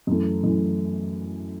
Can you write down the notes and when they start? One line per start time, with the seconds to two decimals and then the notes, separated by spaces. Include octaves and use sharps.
0.07 F#2 E3 A3
0.43 F#2 E3 A3